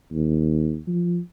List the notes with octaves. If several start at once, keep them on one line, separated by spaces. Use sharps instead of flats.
D#2
F3